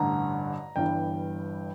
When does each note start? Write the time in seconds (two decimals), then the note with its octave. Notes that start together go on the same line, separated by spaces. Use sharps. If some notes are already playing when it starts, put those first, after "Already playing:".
Already playing: A1 G2 D3 A#5
0.76 G1 G2 E3 G5